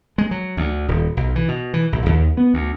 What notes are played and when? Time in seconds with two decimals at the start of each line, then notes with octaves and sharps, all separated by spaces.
0.18 G#3
0.31 F#3
0.57 D2
0.88 D#1
1.17 B1
1.36 E3
1.48 B2
1.74 E3
1.92 A#1
2.06 D#2
2.37 B3
2.54 D2